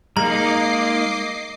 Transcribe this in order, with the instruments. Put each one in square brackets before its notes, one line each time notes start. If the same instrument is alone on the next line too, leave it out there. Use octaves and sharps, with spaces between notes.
[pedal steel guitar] G#3 A#3 D#4 [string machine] D#5 D6 C7 [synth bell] A#5